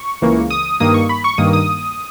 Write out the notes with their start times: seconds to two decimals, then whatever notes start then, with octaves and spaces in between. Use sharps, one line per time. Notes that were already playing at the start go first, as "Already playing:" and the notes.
Already playing: C#6
0.22 C#2 C#3 E3 A#3
0.50 D#6
0.80 G2 D#3 A#3 D#6
0.94 C#6
1.09 B5
1.24 C#6
1.38 G2 D#3 A#3 D#6
1.53 D#6